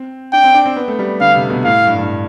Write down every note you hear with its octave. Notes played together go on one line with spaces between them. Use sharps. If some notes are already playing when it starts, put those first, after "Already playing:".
Already playing: C4
D4 G5
C4
D4
C4
B3
A3
G3
D3 F5
C3
B2
A2 F5
G2
G2